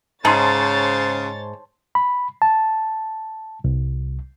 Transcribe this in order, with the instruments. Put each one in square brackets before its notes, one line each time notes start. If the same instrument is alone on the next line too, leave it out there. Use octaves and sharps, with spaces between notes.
[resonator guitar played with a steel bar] G#2 [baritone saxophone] C#3 [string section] C5 C#5 A6 [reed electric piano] A5 C6
[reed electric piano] B5
A5
C2